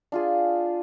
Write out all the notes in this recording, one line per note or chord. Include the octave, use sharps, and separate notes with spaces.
D4 F4 G#4